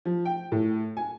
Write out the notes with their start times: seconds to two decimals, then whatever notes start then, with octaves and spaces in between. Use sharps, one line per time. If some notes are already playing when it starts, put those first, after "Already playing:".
0.05 F3
0.25 G5
0.52 A2
0.97 G#5